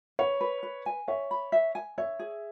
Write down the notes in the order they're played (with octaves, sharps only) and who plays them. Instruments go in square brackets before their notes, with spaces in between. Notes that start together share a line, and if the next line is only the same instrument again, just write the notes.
[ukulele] B4 [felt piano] C#5
[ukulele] B4
B4
G#5
[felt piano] C#5 [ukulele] E5
[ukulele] B5
E5
G#5
[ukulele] C#5 [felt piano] E5
[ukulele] G#4